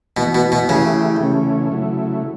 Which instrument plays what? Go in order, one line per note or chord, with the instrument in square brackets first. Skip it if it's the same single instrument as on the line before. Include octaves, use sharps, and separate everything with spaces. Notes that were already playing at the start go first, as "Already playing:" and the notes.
[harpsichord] B2 [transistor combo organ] E3 B3 F#4
[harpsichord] B2
B2
[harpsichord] C#3 [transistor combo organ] E3 A3 E4 G4
[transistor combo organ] C#3 E3 A3 C#4
C#3 F#3 A3 E4